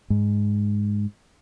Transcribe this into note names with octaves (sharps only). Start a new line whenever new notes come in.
G#2